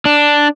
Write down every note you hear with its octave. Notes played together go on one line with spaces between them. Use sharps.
D4